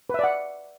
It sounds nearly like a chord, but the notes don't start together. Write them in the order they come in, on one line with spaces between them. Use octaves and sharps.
B4 E5 D5 F#5